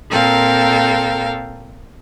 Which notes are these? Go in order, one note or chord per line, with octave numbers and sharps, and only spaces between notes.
A#2 C4 A4 A#4 F5 G5